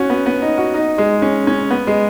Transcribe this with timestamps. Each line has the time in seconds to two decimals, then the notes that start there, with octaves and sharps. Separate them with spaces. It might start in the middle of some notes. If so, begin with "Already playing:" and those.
Already playing: C#4 F#4
0.10 B3
0.26 B3
0.42 D#4
0.58 F#4
0.74 D#4
0.98 G#3
1.22 C#4
1.47 C#4
1.70 B3
1.87 G#3